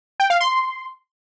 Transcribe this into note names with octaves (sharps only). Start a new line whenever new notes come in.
G5
F5
C6